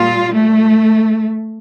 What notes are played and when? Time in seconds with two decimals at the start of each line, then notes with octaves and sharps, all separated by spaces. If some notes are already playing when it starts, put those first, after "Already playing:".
Already playing: A#2 G3 F4
0.33 A3